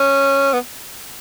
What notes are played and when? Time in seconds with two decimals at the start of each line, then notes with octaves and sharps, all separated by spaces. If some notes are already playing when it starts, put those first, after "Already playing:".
Already playing: C#4
0.53 B3